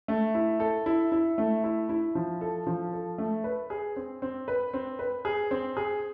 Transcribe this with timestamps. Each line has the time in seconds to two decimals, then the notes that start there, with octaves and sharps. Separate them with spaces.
0.08 A3
0.34 E4
0.60 A4
0.86 E4
1.12 E4
1.38 A3
1.64 E4
1.89 E4
2.15 F3
2.41 A4
2.67 F3
2.93 A4
3.18 A3
3.44 B4
3.70 G#4
3.96 C4
4.22 C4
4.48 B4
4.74 C4
4.99 B4
5.25 G#4
5.51 C4
5.77 G#4